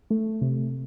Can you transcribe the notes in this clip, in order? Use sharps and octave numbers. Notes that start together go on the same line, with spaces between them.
A3
C3